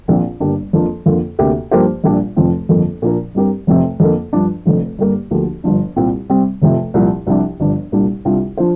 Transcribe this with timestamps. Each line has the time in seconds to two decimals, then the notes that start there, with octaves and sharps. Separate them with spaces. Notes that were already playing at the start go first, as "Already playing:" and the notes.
0.08 A#1 A#2 F3 C4
0.40 G1 G2 G3 A#3 D4
0.73 F2 F3 A#3 D4 A#4
1.06 F2 D3 A#3 F4
1.39 D2 C3 A#3 G4
1.71 G2 F3 A#3 G4 C5
2.04 A#1 A#2 G3 D4
2.36 F1 F2 F3 C4
2.69 G1 F2 D3 F3 A#3
3.02 A#2 F3 D4 A#4
3.35 G2 G3 C4 G4 A#4
3.67 F1 F2 C3 F3 C4
4.00 F2 D3 A#3
4.33 G2 F3 D4
4.65 F1 F2 D3
4.99 G2 D3 G3 A#3 G4
5.31 D2 D3 F3 A#3 G4
5.64 G1 G2 F3 D4
5.96 C2 A#2 G3 C4 F4
6.29 C3 G3 C4
6.62 F1 F2 C3 F3
6.94 C2 A#2 F3
7.27 C2 C3 F3 D4
7.60 G1 G2 F3 D4
7.92 C2 A#2 G3 D4
8.25 C2 C3 G3 D4 F4
8.57 F3 D4 F4 C5